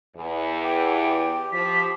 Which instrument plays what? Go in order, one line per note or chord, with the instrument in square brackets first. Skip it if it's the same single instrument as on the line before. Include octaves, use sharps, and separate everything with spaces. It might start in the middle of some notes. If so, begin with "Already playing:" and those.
[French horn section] E2
[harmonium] G4 [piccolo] G5
[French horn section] F3 [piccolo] B6